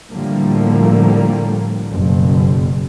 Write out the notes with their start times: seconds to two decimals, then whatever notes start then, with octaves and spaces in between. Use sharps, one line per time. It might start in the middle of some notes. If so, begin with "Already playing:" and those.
0.11 A2 D3 F3 G3 A3 A#3
1.92 F#1 B2